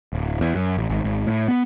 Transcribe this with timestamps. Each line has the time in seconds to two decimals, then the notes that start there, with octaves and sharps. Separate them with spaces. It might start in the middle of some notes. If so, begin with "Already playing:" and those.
0.13 D1
0.41 E2
0.55 F#2
0.77 A1
0.89 G#1
1.04 G#1
1.27 A2
1.48 B3